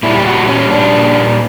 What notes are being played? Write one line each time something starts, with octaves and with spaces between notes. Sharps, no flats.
A#2 G3 E4
G4
F#4
C#4
A#2 G3 D4